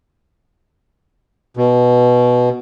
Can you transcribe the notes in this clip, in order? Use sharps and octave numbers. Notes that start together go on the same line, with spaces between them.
B2